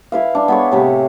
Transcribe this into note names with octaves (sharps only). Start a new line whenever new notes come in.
E4 B4 F5
D4
B3 G#4 C#5
A2 C3 B5